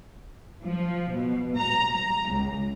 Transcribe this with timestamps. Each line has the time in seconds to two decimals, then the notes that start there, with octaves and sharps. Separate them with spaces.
0.64 F3
1.13 B2
1.57 A#5
1.94 A#5
2.30 C#2